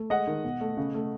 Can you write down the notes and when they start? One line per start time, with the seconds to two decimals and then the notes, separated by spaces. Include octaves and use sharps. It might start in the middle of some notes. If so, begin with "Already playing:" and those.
Already playing: A3
0.10 G#3 D#5 F#5
0.27 D#3
0.44 B2
0.61 A3
0.77 C#3
0.94 A3